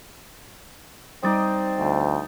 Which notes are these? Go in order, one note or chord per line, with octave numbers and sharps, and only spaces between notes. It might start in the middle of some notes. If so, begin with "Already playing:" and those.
G3 C4 D#4 D5 D#5 D7
D2